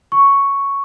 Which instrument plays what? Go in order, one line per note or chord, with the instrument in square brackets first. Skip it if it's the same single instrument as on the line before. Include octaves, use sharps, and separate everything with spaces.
[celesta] C#6